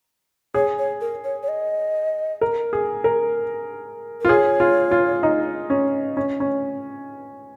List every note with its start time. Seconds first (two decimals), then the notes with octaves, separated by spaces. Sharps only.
0.54 G#4 C#5
0.78 C#5
1.01 A#4
1.24 C#5
1.43 C#5
1.48 D#5
2.41 A#4
2.73 G#4
3.04 A#4
4.21 F4 A#4
4.29 G#4 C#5
4.60 F4
4.91 F4
5.23 D#4
5.70 C#4
6.17 C#4
6.40 C#4